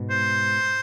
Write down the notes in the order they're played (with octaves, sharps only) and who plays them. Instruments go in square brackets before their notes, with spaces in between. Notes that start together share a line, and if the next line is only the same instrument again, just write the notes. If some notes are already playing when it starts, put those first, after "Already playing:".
Already playing: [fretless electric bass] G#2 B2
[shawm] C5